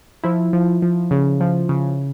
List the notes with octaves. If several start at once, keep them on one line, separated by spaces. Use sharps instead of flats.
F3 E4
F3
F3
C#3
F3
C#3